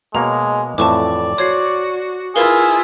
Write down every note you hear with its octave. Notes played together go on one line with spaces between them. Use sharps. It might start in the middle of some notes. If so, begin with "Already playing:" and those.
B2 G#3 A#3 C#5 A#5
F2 A2 E3 D5 A5 C#6 D6
F#4 C5 C#5 G#6 C7
E4 F4 G#4 A#4 B4 F5